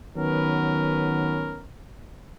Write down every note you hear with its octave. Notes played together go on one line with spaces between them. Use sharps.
D#3 F#3 B3 C#4 A#4 B4